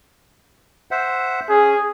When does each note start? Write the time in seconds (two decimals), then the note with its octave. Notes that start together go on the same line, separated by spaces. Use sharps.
0.91 C5 E5 F#5
1.49 C#4 G#4